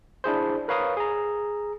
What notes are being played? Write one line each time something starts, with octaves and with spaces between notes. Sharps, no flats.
D4 E4 G#4 C5
A#4 B4 C#5 F5 A#5 D#6
G#4 A#5